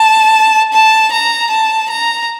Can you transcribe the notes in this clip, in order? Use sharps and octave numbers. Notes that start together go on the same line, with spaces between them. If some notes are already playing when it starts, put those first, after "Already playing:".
Already playing: A5
A5
A#5
A5
A#5